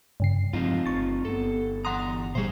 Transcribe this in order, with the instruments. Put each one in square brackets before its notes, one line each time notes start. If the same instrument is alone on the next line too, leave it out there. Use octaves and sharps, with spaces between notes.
[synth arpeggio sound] G2 C#3 C7
[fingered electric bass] F2 G#2 [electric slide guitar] C4 D#4 F4
[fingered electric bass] G1 [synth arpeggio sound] C#6 A6
[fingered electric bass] G1 B3 [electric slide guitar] A4
[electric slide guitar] E2 A#5 [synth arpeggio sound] F#5 C6 D#6
[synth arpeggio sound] A#2 G3 [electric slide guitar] G#4 C5